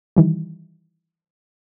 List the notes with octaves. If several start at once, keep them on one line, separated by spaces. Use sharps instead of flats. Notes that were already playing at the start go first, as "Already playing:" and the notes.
D#3 E3 G3